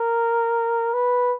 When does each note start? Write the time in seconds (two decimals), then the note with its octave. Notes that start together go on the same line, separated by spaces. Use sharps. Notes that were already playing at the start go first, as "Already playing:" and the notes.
Already playing: A#4
0.94 B4